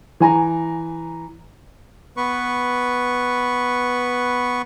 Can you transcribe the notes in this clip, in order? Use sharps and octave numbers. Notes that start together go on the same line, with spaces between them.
E3 G#5 A#5
B3 B4 C#6